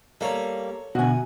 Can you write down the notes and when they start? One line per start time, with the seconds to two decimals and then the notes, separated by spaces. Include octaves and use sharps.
0.21 G3 A#3 A4 C#5
0.95 F#2 B2 D3 F#4 F#5 G#5